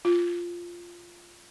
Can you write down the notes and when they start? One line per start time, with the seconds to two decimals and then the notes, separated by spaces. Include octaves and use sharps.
0.05 F4